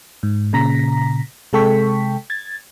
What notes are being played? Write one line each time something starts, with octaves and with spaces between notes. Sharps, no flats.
G#2
A#2 C#3 A#5 A#6 B6
C3 G#3 A4 G5 C#6 B6
G#6 A6